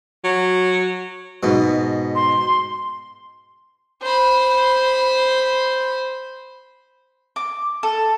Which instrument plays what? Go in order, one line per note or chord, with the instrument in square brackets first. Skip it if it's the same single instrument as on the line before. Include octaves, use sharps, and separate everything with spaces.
[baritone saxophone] F#3
[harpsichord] G#2 B2
[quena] C6
[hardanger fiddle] C5 B5
[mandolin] D6
A4